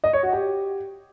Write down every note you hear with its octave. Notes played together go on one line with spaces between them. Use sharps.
D#5
C#5
F#4
G4